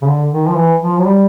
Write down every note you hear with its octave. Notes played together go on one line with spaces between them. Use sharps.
C#3
D3
D#3
F3
E3
F3
F#3
G3